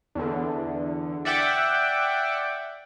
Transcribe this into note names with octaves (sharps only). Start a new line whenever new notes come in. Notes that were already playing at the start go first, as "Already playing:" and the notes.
E2 D3
D5 E5 F#5 G5 D6